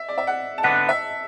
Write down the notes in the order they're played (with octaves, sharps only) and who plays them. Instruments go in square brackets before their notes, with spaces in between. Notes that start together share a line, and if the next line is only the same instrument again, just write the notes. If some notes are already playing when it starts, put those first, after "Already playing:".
Already playing: [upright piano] E5
D5
E5
F#5
A5
[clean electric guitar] D3 B3 D4 B4 [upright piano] F#5
[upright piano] E5